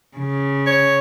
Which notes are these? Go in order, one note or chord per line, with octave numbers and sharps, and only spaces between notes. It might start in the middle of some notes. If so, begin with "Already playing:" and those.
C#3
C#5